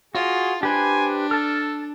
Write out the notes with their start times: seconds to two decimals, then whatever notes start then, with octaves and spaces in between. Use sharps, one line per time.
0.15 F4 F#4 G#4
0.63 D4 G4 B4 C5 G#5
1.31 A4 A5 F6